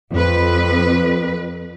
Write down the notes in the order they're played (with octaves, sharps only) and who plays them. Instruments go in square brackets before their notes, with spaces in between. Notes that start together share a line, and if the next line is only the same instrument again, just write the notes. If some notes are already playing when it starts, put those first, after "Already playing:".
[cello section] F2 B4